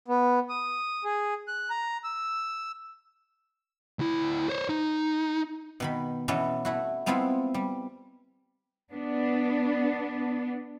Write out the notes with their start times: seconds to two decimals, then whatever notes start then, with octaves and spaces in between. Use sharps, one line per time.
0.08 B3
0.49 D#6
1.04 G#4
1.48 F#6
1.70 A#5
2.04 E6
3.99 D2 E4
4.49 C5 C#5
4.69 D#4
5.80 B2 D#3 B5
6.28 B2 E3 B3 C#4 A4
6.65 A3 E4 F#4
7.06 G#3 B3 C4 E4 F4 A4
7.54 G3
8.93 B3 D4